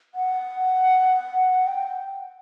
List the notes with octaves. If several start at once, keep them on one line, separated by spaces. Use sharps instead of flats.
F#5
G5